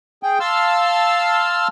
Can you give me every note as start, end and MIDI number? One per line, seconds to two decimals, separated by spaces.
0.23 0.38 68
0.23 0.38 79
0.40 1.68 77
0.40 1.68 81
0.40 1.68 84
0.40 1.68 88
0.40 1.68 89